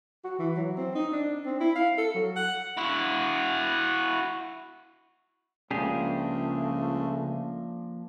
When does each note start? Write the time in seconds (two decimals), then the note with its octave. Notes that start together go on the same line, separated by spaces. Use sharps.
0.24 F#4
0.39 E3
0.56 F#3
0.77 C4
0.95 D#4
1.12 D4
1.46 C4
1.61 E4
1.75 F5
1.98 A4
2.15 F#3
2.36 F#5
2.77 E4 F#4
5.71 C#2 C#3 F3 A3 A#3 D4 G4 G#4